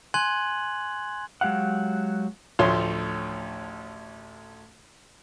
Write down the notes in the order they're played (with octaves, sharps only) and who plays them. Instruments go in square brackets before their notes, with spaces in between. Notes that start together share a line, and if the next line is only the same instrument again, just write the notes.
[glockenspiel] G#5 C6 F#6 G#6 F#7
[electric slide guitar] F#3 G#3 G4 F5 F#5
[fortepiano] A1 D2 F3 C#5 C6